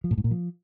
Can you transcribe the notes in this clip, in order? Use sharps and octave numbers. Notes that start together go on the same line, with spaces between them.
F3
A2
G#2
A#2
F3